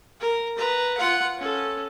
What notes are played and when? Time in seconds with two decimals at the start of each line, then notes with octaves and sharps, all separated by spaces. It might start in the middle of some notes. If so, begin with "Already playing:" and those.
0.20 A#4
0.57 B4 A#5
0.97 F4 F#5
1.38 C#4 A4